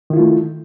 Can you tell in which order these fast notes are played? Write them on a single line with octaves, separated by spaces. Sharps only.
D#3 E4 F4 A3